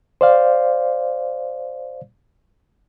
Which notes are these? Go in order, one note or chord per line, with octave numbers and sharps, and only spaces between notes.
C5 D5 F5